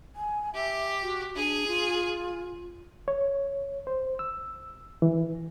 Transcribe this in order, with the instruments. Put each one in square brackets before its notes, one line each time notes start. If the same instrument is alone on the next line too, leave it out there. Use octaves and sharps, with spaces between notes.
[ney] G#5
[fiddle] G4 [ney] E5
[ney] F#4
[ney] D4 [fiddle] G#4
[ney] F4
[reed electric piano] C#5
C5
E6
E3